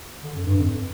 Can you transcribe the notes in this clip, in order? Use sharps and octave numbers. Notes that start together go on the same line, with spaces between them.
D3
F#2
G2
F2